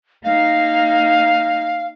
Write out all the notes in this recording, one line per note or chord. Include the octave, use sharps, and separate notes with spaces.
A#3 D#4 F5